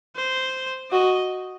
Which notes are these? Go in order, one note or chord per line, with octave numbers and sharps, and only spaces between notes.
C5
F#4 D#5